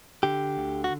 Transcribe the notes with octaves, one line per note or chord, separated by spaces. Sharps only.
D3 G4
D2
F#4